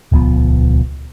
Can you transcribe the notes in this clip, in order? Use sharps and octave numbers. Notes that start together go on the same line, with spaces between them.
D#1 C#2 F3 B3